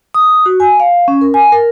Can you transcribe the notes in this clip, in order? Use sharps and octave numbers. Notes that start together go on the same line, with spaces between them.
D#6
F#4
G#5
F5
C#4
A#4
G#5
A#4